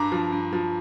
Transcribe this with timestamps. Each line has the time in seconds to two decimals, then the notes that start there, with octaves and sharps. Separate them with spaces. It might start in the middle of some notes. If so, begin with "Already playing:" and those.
Already playing: G2 A#5 D6
0.12 F3
0.32 G2
0.53 F3